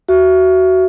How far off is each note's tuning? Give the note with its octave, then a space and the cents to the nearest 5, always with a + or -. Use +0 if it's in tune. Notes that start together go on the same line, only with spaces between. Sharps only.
F#4 +15 E5 +20